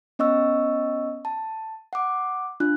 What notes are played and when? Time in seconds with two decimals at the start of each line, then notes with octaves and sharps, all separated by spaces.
0.19 B3 C#4 D#5 C#6 E6
1.25 A5
1.93 F#5 D6
2.60 D4 F4 F#6